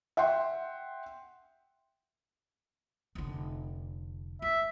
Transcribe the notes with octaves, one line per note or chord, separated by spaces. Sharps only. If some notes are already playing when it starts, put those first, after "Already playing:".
E5 F#5 G5 C6
F1 D3
A3 E5